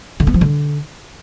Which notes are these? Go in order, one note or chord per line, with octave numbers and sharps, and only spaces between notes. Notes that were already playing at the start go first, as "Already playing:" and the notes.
D3
B3
F3
D3